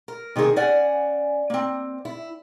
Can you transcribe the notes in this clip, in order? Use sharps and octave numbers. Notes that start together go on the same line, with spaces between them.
A#4
C3 D#3 A#3 G#4 A#4
C#4 D5 F#5 G#5
A#3 C4
E4